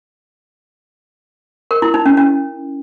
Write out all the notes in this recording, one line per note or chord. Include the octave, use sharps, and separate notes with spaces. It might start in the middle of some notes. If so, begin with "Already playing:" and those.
A#4
E4
D#4
C#4
C#4